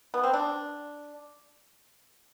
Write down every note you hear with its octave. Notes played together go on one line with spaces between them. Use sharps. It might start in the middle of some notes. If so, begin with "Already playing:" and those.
B3
C4
D4